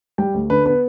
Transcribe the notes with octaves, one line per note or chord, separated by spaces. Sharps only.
G3 G5
D2
D3 B4
B3 B4